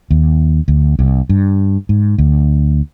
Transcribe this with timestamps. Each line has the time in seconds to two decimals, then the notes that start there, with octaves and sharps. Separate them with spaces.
0.11 D#2
0.68 D2
0.99 C2
1.29 G2
1.89 G#2
2.18 D2